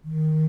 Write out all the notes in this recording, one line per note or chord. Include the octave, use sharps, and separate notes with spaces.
D#3